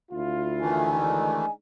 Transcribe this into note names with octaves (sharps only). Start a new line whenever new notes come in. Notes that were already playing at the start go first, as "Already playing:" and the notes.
D2 E4 F4
D#3 E3 A3 G#5
G#3 D4 D#4